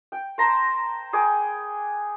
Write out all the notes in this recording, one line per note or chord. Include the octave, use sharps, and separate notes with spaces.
G5
C5 A5 A#5 C6
G#4 B4 G5 D6